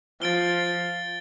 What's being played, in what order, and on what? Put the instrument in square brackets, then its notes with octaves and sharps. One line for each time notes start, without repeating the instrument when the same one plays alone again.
[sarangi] F3 [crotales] A6 D7 G7